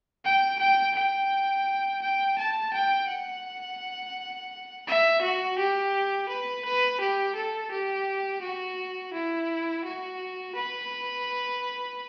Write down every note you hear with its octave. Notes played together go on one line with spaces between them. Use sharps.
G5
G5
G5
G5
A5
G5
F#5
E5
F#4
G4
B4
B4
G4
A4
G4
F#4
E4
F#4
B4